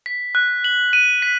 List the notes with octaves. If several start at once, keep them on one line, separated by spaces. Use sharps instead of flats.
B6
F#6
F#7
D#7
B6